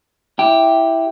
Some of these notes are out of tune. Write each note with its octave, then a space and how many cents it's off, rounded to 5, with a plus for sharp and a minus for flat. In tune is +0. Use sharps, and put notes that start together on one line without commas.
E4 +0 G4 +0 G5 +0